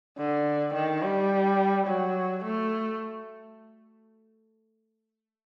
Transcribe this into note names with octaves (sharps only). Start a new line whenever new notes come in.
D3
D#3
G3
F#3
A3